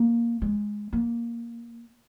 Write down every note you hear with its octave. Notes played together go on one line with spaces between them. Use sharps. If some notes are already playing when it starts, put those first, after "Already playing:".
Already playing: A#3
G#3
A#3